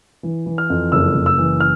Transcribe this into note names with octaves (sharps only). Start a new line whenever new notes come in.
E3
E3
F6
F2
F#1 E6
F#1
E6
E3
F6